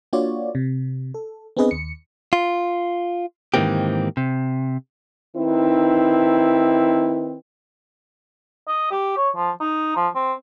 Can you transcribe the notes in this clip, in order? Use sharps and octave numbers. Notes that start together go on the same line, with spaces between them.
A#3 D4 F4 F#4 C#5 D5
C3
A4
B3 C4 D4 G#4 B4 D#5
D#2 C#7
F4
G#2 D#3 E3 A#3 C4 G4
C3
D#3 C4 D#4 E4 B4
D#5
G4
C#5
F3
D#4
F3
C4